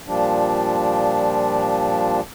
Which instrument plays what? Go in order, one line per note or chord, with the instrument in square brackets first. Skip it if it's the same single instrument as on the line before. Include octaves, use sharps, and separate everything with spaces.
[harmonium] A#2 F3 G3 D4